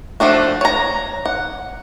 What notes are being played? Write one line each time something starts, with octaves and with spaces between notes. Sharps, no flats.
F3 A3 D4 F#4
C#5 A#5
F#5